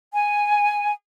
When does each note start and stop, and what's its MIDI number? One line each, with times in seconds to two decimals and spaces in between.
0.13 0.90 80